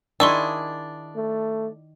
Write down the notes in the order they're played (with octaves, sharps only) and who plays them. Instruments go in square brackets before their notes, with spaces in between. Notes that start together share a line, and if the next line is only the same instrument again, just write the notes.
[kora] D#3 E4 G#4 [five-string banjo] D4 [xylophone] C6 C#6 E6
[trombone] A3